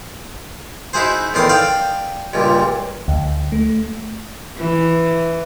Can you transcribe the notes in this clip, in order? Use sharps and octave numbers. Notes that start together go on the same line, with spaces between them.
D#4 E4 F#4 G#4 C5
E2 A2 D#3 C6 D6 D#6
D5 F5 G5 D6 D#6
C#2 G2 A#2
D2
A3
E3